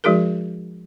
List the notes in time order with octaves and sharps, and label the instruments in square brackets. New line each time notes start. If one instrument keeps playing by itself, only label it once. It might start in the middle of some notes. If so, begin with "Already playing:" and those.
[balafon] F3 G#3 D#4 F#4 G#4 A#4